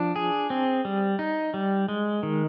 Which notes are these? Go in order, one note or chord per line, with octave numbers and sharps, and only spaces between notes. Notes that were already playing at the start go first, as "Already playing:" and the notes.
Already playing: F3 D4
G#4
C4
G3
D#4
G3
G#3
D#3